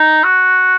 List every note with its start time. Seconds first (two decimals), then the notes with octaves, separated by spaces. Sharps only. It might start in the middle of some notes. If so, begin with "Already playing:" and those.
Already playing: D#4
0.24 F#4